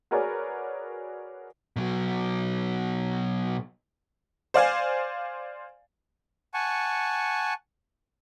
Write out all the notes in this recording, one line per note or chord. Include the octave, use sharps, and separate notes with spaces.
F#4 G#4 A#4 B4 C#5 D5
B2 F#3
C5 D5 F5 G#5
F#5 G#5 A5 C#6